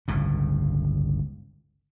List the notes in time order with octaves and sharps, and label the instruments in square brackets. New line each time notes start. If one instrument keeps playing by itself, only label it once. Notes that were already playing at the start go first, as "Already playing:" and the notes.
[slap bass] G1 C#2 A2